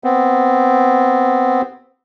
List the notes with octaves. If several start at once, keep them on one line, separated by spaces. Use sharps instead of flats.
B3 C4